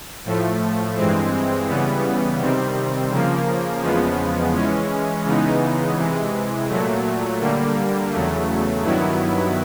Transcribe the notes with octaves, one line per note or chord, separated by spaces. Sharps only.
A2 F3 A3
G2 E3 G#3 C4
C#3 E3 G3 B3
C3 D#3 G3 C4
C#3 F3 A#3
E2 C#3 F3 G#3 B3
E3 G#3 C#4
C#3 E3 G#3 B3 D#4
C3 E3 G#3
A#2 F#3 A3
D3 G3 A#3
E2 C#3 F#3 A3
G2 D#3 F#3 B3 E4